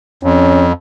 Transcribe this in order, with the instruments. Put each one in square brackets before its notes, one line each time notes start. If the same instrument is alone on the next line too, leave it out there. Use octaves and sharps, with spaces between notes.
[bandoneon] F2 [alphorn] C#4